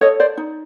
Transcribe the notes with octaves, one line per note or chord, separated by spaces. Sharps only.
A4 C#5 D#5
C5 D5
D#4